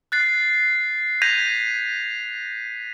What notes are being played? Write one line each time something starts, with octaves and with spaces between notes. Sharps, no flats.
F#6 A6 C7
G6 G#6 A#6 B6 D#7 F7